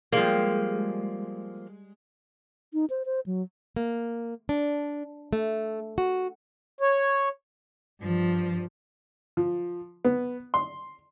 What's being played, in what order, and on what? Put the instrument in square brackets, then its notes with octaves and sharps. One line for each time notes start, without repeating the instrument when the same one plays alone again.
[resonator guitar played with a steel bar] F3 A#3 [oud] G3 G#3
[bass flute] D#4
C5
C5
F#3
[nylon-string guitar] A#3
D4
A3
F#4
[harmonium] C#5
[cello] G2 F3
[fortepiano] F3
B3
C6